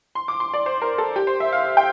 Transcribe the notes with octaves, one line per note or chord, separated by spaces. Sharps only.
C6
D6
C6
D5
C5
A#4
A4
G4
C5
E5
F5
G5